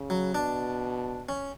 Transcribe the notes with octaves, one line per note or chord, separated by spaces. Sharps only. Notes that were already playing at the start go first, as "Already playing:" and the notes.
Already playing: C#3
F#3
B2 D4
C#4